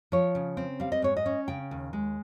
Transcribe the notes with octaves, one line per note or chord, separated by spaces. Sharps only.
F3 C#5
C#3
C4
G3 F5
D#5
G#2 C#5
D#5
C#4
C#3 G5
D#2
G#3